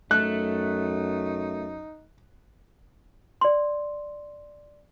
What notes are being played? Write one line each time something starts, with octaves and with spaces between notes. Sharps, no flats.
F#2 A3 D#4 F#6
D5 C6